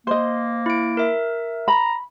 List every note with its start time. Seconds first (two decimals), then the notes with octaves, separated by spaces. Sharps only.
0.07 A#3 C5 D#5
0.66 E4 D7
0.97 A#4 E5
1.68 A#5 B5